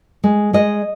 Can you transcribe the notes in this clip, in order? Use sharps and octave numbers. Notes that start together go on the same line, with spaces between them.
G#3
G#3 D#5